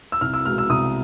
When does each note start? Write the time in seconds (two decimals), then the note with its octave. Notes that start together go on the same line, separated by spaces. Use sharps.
0.12 E6
0.21 C2 F6
0.34 E6
0.45 B2 G#3 F6
0.58 E6
0.70 C2 D#6